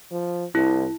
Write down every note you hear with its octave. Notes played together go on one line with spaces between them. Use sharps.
F3
C2 E4